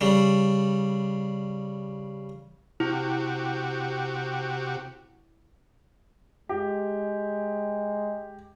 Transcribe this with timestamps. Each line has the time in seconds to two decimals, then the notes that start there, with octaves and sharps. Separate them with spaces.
0.01 C#3 G3
2.80 C3 E4 F#4 G4
6.49 G#3 G4